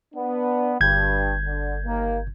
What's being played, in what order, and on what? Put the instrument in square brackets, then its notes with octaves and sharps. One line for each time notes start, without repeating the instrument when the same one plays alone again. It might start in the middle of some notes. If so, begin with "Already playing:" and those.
[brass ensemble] B3 D4
[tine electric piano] G1 G6 G#6 [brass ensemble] G2
[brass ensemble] D3
D#2 A#3